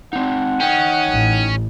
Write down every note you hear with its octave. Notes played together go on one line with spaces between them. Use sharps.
C4 D#4 F#5
C#4 D#4 G5
A1